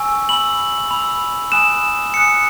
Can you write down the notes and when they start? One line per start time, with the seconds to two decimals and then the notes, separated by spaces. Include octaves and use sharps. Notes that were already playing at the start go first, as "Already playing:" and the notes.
Already playing: G#5 C#6 E6
0.29 B5 E6 F#7
0.91 B5 E6
1.52 G#5 B5 D#6 F#6 E7
2.14 G#5 B5 D#6 F#6 C#7